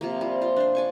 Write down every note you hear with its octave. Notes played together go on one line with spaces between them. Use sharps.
C3 F3 A#3
F3 G3 C4
F4 C5
D4 C5
D5 G#5 C#6